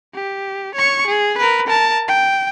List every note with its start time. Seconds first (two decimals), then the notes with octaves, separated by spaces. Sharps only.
0.14 G4
0.75 C#5 C#6
1.07 G#4
1.38 A#4 B4
1.67 A#4 A5
2.08 G5